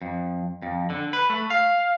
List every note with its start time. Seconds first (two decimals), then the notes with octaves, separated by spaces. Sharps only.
0.02 F2
0.62 F2
0.90 D3
1.13 B4
1.30 A3
1.50 F5